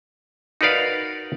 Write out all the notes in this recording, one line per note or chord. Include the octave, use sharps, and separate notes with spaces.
D#4 F#4 A#4 B4 D5 F5